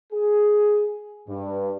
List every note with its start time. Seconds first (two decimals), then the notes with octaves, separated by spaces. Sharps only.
0.13 G#4
1.28 G2